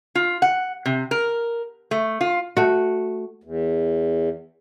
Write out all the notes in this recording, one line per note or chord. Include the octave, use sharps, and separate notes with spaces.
F4
F#5
C3
A#4
A3
F4
A3 F#4
E2